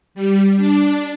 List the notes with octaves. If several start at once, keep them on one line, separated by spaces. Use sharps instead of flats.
G3
D4